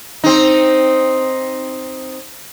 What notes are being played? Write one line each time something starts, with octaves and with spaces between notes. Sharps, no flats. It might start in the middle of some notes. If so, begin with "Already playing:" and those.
C4 D#4